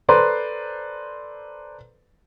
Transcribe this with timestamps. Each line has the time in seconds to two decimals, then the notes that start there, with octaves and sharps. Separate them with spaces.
0.09 A4 B4 C5 D5 A#5 C6